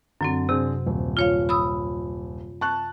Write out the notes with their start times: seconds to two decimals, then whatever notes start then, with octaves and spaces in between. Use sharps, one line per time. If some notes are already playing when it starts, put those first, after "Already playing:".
0.21 F#2 D3 F#3 C4
0.49 C3 C4 D4 G#4
0.87 D#1
1.17 F4 C#5 F5
1.49 B5 D#6 E6
2.61 A5 C#6 F#6